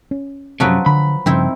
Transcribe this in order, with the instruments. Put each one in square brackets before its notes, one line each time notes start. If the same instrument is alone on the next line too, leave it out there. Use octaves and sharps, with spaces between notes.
[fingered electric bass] C#4
[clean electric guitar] F#2 A2 C3 [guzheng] F3 F#3 B4
[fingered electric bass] D3 [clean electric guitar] B5
[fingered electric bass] G2 C#3 F3 [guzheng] C4 D#4 E4